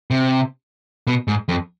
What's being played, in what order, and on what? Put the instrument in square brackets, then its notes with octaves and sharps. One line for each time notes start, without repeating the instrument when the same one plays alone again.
[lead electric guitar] C3
B2
G#2
F2